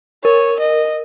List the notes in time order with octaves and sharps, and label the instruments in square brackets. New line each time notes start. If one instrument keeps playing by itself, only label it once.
[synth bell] A#4 [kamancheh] C#5
[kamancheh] D#5